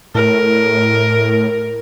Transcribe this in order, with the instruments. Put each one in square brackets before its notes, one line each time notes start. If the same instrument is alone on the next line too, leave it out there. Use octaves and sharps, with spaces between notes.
[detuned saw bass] A2 [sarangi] A#4